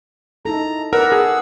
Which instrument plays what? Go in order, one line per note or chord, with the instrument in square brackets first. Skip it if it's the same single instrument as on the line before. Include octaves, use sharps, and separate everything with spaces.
[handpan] D#4 E4 A4 [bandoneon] A#5
[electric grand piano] A#4 [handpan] B4 D5 [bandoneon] F#5 E6
[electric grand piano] G#4 [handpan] A4